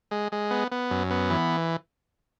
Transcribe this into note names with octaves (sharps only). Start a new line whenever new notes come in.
G#3
G#3
B3
B3
F#2
B3
E3